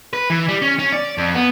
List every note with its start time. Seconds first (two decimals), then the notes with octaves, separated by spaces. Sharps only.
0.13 B4
0.30 E3
0.48 G3
0.62 C#4
0.79 C#4
0.93 D5
1.18 F2
1.35 B3